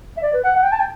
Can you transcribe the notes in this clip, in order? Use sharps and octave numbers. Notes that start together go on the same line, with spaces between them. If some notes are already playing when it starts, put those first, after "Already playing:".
E5
D5
B4
F#5
F#5
G5
A5
G5